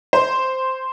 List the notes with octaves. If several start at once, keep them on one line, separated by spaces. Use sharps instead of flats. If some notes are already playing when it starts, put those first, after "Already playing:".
C5